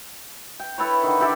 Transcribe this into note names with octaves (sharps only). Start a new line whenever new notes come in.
G5
E4 A4 B4 C#5
D3 D#3
E4 G4 D5 E5